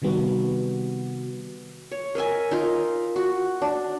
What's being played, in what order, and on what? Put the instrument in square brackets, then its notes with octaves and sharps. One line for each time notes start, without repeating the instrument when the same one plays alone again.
[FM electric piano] C3 D#3 G3 B3 F#4
[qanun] C#5
A#4 D#5 E5 G#5
D#4 F4 A#4
F#4
D4